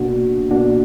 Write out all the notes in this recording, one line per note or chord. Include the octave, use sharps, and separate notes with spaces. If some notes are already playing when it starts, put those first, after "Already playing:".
Already playing: B2 A#3 D4 F#4
B2 A#3 D4 F#4